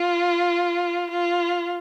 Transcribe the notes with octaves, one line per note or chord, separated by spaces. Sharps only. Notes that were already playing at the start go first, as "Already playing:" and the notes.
Already playing: F4
F4